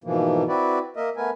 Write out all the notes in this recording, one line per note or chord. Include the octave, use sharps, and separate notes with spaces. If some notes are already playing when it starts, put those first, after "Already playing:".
G#2 B2 E3 F3 A#3
C4 E4 F#4 B4 D5
A#3 A#4 D#5 E5
A3 B3 A#4 B4 G#5